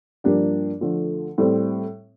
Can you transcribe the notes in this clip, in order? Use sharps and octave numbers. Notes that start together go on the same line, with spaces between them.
G2 F3 A#3 D4 G4
D3 F3 A3
A2 G3 C4